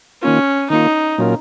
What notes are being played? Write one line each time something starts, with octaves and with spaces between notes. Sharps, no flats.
D#3 A#3 C#4 F4
D#3 A#3 D#4 F4
A#2 F#3 C#4 F4 A#4